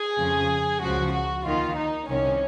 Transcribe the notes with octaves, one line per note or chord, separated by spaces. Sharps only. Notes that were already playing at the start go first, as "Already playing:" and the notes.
Already playing: G#4
F2 C#3 F3
C#2 C#3 F3 F#4
F#4
D#2 D#3 F4
D#4
C2 C3 D#3 C#4